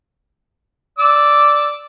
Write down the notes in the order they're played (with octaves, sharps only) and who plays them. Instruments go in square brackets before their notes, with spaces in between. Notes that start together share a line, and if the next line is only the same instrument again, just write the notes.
[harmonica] D5 D6 E6